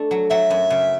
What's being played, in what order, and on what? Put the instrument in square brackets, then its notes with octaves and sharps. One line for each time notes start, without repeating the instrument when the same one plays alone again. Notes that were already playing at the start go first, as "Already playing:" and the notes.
Already playing: [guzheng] A3 D4
F#3
[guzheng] F#3 [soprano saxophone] E5
[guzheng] F#2
C#3